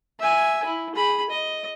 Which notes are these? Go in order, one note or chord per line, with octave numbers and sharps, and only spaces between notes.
E5 G#5
E4
G#4 B5
D#5